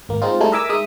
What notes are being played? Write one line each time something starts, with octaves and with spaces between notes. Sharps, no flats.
G#1 A#3
G#3 C4 D#4 F4
G3 A3 D#4 E4 G#4 A4
A#4 D#5 E5 G#5 D6 E6
G#3 D#4 E5 D#6